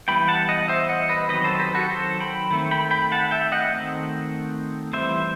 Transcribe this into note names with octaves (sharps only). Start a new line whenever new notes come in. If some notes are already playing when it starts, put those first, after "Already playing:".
E3 G3 B3 G5 B5
F#5 A5
D#5 F#5
C5 E5
D#5 F#5
B4 D#5
D#3 F#3 C4 B4 D#5
A4 C5
A4
G4 B4
F#4 A4
A4 C5
G5 B5
D#3 A3 C4
G5 B5
G5 B5
F#5 A5
E5 G5
D#5 F#5
D#3 A3 C4
E3 G3 C4 C5 E5